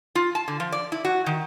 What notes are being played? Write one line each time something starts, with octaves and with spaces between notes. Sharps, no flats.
F4
A5
D3
F3
D5
E4
F#4
D#3